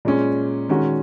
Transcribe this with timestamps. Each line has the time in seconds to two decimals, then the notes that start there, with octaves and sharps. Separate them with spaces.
0.05 A#2 G#3 C#4 G#4
0.69 D#3 G#3 C#4 F#4